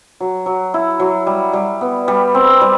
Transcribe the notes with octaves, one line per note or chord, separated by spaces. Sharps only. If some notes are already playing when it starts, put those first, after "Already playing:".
F#3
F#3
E4
F#3
G3
G3
B3
G3
C4
G3